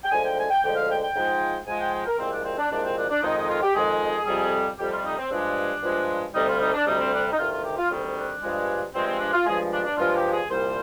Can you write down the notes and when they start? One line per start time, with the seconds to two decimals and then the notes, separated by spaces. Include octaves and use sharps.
0.04 G5
0.11 D2 D3 F3 G#3 G#5
0.24 G5
0.38 G#5
0.50 G5
0.63 D2 D3 F3 G#3 G5
0.76 F5
0.89 G5
1.02 G5
1.15 G#2 F3 G#3
1.67 G#2 F3 G#3 G#5
1.80 G5
1.93 G5
2.07 A#4
2.19 C2 A#2 F3 G#3 C4
2.32 D4
2.45 C4
2.58 D4
2.71 C2 A#2 F3 G#3 D4
2.84 C4
2.97 D4
3.10 D4
3.23 F2 D#3 G#3 D#4
3.36 D#4
3.49 F4
3.62 G4
3.75 F2 D#3 G#3 G#4
4.27 F2 C3 G3
4.79 F2 C3 G3 G4
4.92 F4
5.05 D#4
5.18 C4
5.31 G2 F3 G#3 D4
5.83 G2 F3 G#3
6.34 D2 C3 G3 D#4
6.48 F4
6.61 D#4
6.74 D4
6.86 D2 C3 G3 D#4
7.00 C4
7.12 D4
7.32 D#4
7.38 D2 C3 D#3 G3 F4
7.52 F4
7.64 G4
7.78 F4
7.90 D2 C3 D#3 G3
8.17 D4
8.42 G2 F3 G#3
8.94 G2 F3 G#3 C4
9.07 C4
9.20 D4
9.33 F4
9.46 G2 F3 G#3 G#4
9.72 D4
9.85 D4
9.98 G2 F3 G#3 F4
10.16 G4
10.32 G#4
10.50 C2 A#2 G3 C5